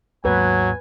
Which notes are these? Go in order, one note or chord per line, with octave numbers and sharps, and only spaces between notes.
D#2 G#2 F#3 A#3 B4 G#5